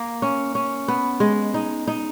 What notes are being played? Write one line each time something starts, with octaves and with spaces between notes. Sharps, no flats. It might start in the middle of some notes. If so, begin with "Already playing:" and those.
Already playing: A#3
C#4
C#4
B3
G#3
D#4
D#4